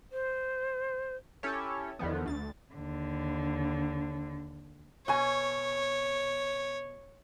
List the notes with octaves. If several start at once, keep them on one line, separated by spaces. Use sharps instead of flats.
C5
C#4 E4 G4 A4 C#5
E2 D3 D#3 F3 B3
D2 A6
D#2 D3
B2 C#5 G#5